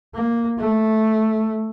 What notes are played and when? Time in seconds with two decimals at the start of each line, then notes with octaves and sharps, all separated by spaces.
0.15 A#3
0.59 A3